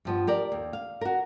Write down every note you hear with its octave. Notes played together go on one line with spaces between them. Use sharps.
G2 F3 B3
G4 A#4 D5
D#2
F5
F#4 A#4